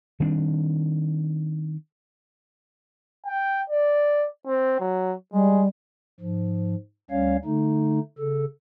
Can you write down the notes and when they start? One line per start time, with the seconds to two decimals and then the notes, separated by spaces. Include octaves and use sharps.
0.20 D#3 G3 C4 D4
3.26 G5
3.70 D5
4.47 C4
4.80 F#3
5.33 G3 G#3
6.20 G#2 F3
7.10 D2 G3 C#4 C#5 F5
7.45 D3 A3 D#4
8.18 C#3 A4